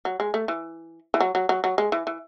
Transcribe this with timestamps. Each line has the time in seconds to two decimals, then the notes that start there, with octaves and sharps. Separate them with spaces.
0.05 F#3
0.20 G#3
0.34 A3
0.48 E3
1.14 E3
1.20 F#3
1.35 F#3
1.49 F#3
1.64 F#3
1.78 G#3
1.92 E3
2.07 E3